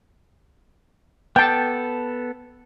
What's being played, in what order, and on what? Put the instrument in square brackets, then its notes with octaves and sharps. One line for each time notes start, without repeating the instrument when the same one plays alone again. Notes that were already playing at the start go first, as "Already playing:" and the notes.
[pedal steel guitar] B3 A4 [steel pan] G5 A5